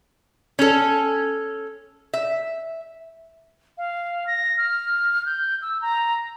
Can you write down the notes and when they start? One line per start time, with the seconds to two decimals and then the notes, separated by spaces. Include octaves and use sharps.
0.59 C#4 A4
2.14 E5
3.78 F5
4.27 A#6
4.58 F6
5.26 G6
5.62 E6
5.82 A#5